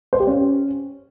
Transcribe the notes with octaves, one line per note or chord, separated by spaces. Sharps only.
C5
G4
C#4